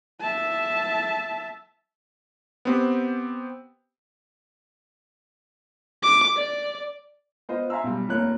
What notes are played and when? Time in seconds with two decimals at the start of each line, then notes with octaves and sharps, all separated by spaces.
0.21 E5 A5
2.65 B3 C4 G4
6.03 D6
6.37 D5
7.49 B3 F4 C5 D#5
7.70 E5 F5 G#5 A#5 C6 E6
7.84 B1 G3
8.09 F1 D#2 A#3 F4 C#5 F#6